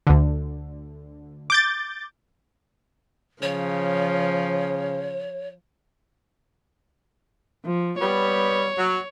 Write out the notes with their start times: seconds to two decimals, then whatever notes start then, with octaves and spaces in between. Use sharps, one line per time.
0.07 D2 D3
1.50 D6 G6 A6
3.42 C#3 F3 C#5
7.65 F3
8.00 G3 B3 C#5
8.77 F#3